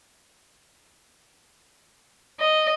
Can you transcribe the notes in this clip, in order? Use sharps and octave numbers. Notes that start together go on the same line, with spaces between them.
D#5